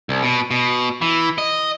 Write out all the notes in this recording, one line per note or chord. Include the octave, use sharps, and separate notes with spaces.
C2
B2
B2
E3
D#5